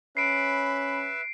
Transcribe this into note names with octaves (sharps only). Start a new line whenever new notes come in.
C#4 B4 E5 B5 C7 D7